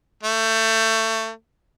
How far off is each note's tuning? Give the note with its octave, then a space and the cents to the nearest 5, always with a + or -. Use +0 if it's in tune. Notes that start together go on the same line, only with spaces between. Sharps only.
A3 +25